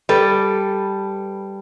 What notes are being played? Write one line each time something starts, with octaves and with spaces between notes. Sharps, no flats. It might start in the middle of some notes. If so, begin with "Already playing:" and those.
G3 A4 B4